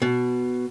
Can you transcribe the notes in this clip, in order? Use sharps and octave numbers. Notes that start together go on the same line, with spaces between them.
B2